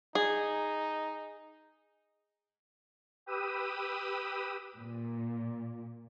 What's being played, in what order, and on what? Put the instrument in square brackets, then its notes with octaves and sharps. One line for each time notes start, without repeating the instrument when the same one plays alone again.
[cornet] D#4 [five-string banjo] G#4
[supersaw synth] G4 B4 D#6 E6 D#7
[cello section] A#2